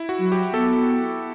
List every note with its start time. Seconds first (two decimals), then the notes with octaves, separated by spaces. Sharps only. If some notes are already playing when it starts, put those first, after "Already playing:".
Already playing: E4
0.09 F#4
0.20 F#3
0.32 G4
0.54 B3 A4